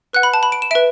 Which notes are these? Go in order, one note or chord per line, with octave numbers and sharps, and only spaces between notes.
B4 F#5 F#6
B5
A5
B5
D7
E7
B4 E5 D7